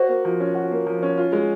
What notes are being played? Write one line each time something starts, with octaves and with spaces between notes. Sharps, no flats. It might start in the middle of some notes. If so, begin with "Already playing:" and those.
Already playing: F#4 C5
A#3
F3
C#4
F#4
A#3
F3
C#4
F4
G#3